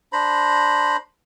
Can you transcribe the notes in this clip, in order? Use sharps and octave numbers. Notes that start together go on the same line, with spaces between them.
D4 C5 A#5 B5